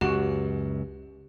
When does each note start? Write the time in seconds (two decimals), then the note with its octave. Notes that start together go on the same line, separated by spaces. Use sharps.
0.01 C#2 F#2 F#4 G4